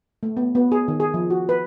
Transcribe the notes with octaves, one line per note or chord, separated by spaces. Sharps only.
A3
B3
B3
G#4
D#3
G#4
F3
F#4
B4